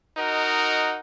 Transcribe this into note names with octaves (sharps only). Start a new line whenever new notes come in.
D#4 F#4 A#4 D#5 F#5